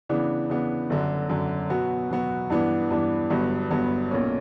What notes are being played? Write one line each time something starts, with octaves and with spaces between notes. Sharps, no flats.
C#3 E3 B3 D4
C#3 E3 B3 D4
G1 F#2 D3
G1 F#2 D3
B2 F#3 B3 F#4
B2 F#3 B3 F#4
G2 E3 B3 D4
G2 E3 B3 D4
G1 G2 F#3 B3
G1 G2 F#3 B3
B1 A#2 A#3 C#4